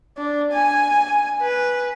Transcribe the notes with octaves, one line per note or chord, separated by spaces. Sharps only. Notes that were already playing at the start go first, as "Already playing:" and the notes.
D4
G#5
B4